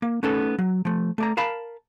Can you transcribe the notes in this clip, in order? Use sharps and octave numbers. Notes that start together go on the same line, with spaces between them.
A#3
A3 B3 C#4 D#4 A4
F#3
F3 A3
A3 D5 A#5
A#4 F5 A5 B5